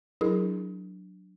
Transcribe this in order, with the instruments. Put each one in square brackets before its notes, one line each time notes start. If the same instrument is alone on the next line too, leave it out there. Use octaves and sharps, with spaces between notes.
[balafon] F#3 D4 [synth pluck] E4 G#4 A#4